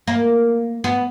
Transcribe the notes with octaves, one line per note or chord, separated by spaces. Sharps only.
A#3
B3